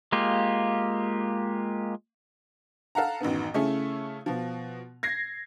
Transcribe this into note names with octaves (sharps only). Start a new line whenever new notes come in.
G#3 A#3 F4 G4
A4 F5 F#5 A#5
A1 F#2 D#3 B3
C#3 A3 C#4 E4 G#4
B2 F3
G#6 A#6 C7